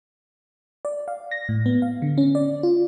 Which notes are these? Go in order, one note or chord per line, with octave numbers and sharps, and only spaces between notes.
D5
F5
A#6
A2
B3
F5
D3
C#4
D5
F4